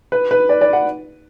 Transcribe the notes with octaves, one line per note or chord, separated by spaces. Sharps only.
B4
B4
D5
D5
F#5